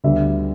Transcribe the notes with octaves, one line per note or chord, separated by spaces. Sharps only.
D2 D3 G3 B3 E5